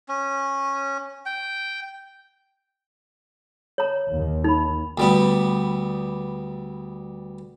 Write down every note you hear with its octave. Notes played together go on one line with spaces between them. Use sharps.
C#4
G5
C#5 A#5
D#2
D#4 B5
D2 G3 B3